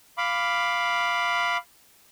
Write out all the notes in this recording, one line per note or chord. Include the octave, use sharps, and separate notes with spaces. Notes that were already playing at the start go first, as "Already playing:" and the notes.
F5 B5 D6